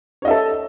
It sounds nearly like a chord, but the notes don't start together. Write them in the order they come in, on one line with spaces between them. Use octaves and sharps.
C#5 D#5 E5 A4